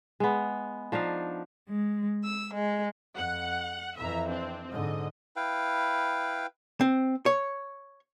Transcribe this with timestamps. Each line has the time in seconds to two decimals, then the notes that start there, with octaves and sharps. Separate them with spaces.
0.20 G#3 B3
0.92 F3 D4 D#4 F5
1.69 G#3
2.24 E6
2.55 G#3
3.16 F2 F#5
3.96 F2 E3 E5 A#5
4.28 C4 D4
4.71 G#2 D3 D#5
5.36 E4 B4 F5 G5
6.81 C4
7.26 C#5